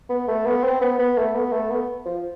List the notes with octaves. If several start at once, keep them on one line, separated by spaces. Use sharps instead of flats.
B3
A3
B3
C4
B3
B3
A3
B3
A3
B3
F3